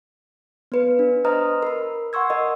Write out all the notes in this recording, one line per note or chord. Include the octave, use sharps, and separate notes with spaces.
B3 B4
D4
B4 C5 D#5 A#5 D#6 F6
A#4 B5
F#5 C6 C#6 E6 G#6
A#4 D#5